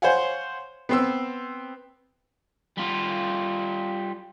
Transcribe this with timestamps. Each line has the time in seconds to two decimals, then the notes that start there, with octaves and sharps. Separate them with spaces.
0.02 C5 C#5 F5 F#5 G#5
0.89 B3 C4 E6
2.78 G3 F4